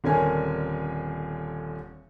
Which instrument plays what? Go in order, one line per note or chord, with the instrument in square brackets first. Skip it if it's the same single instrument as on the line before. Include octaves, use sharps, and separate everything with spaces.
[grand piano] D#1 D3 C4 C#4 A#4 G#5